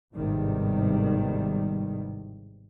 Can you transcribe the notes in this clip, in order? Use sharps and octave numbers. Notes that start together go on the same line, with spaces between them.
G#1 E2 A2 C3 D#3 G3